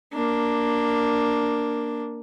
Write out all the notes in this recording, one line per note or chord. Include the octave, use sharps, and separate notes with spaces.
A#3 D4